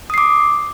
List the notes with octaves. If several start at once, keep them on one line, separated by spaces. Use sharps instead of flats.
D6 D#6 C7